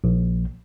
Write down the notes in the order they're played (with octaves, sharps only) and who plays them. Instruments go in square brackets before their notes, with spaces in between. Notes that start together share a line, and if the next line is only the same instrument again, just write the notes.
[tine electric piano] A#1